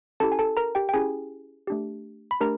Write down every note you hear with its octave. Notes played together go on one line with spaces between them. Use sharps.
C#4 E4 G4 A4 A5
G#5
A4 A5
A#4 A#5
G4 G5
G5
C#4 E4 G4 G#4 G#5
A3 D4 G4
B5
A3 D4 G4 A#4 A#5